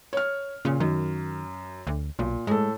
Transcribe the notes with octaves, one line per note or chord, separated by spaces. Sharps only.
C#5 F6
A#2 C#3
F#2 D#3
D2
B1 A#2
A2 G#3 A4